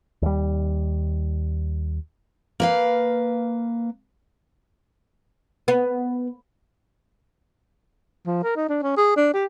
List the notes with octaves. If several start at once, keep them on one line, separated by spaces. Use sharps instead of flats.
D#2 G3
A#3 B4 F5
B3
F3
A#4
D#4
D4
C#4
G#4
D4
G4